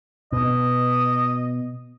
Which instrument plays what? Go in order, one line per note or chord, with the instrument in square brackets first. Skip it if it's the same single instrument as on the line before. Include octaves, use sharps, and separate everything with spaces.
[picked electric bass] B2 [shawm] D#5